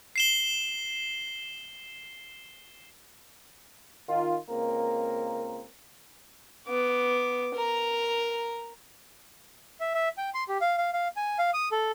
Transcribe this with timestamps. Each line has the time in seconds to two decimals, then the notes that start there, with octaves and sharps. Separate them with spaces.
0.16 C7 E7 G7
4.08 D#3 F4
4.49 C#2 A#3 C4 A#4
6.68 B3 D6
7.55 A#4 A#5
9.80 E5
9.94 E5
10.18 G5
10.34 C6
10.49 G4
10.61 F5
10.78 F5
10.93 F5
11.16 G#5
11.39 F5
11.54 D#6
11.72 A4